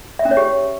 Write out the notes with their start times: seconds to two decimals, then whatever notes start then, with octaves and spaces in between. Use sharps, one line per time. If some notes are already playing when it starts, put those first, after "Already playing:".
0.19 E5
0.25 C#4
0.31 C#5
0.37 G4